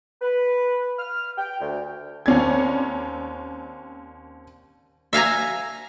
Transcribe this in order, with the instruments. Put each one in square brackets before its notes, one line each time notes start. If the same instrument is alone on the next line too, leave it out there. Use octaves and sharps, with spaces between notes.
[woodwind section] B4
F6
G5
D2
[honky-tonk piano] D#2 C4 C#4 D5 G#6
[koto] E5 F5 G#5 A#5